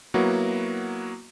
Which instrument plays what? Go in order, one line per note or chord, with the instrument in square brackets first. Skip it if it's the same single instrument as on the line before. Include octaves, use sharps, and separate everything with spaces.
[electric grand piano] F#3 A#3 B3 E4 F#4